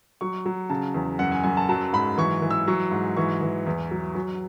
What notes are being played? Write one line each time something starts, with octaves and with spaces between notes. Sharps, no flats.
F#3 C#6
F#3
C#3 A5
E2
F#2 F#5
G#5
F#2 G#5
A5
F#3 A5
G#2 B5
E3 C#6
E3
E6
F#3 C#6
G#2
E3 C#6
E3
E2
F#3
F#3